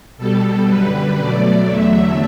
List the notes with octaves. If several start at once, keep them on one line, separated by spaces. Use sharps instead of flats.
B2 G3 A4
F#2 D3 G3 B4
B2 F#3 A3 D5
E2 D3 F#3 A3 E5